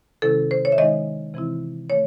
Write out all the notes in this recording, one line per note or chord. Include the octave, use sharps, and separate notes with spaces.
C3 D#3 G#3 C#4 E4 A4
C5
C#5
E5
D#3 G#3 D#4 D#5
C3 E3 C4 E4
D#3 A3 C#5